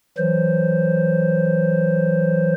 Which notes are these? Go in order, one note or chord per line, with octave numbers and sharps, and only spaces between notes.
E3 F#3 C5